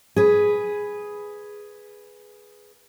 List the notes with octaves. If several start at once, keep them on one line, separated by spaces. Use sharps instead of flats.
G#4 B4